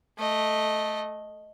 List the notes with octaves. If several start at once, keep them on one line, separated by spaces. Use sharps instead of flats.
A3 D#5